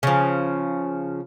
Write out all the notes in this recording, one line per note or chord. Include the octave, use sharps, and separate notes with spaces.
C#3 F3